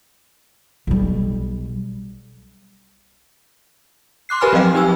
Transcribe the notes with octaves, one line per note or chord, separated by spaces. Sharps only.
B1 G3
C6 D6 F#6 C7
G4 A#4 B4 G#5 B5 F6
F3 F#3 C4 D#5 F5 G5
D#4 G4 G#5 E6